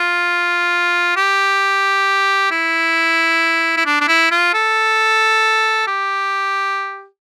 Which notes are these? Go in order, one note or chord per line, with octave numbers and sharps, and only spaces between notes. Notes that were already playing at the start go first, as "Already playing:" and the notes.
Already playing: F4
G4
E4
E4
D4
D4
E4
F4
A4
G4